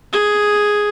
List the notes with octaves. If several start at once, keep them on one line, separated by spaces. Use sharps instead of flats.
G#4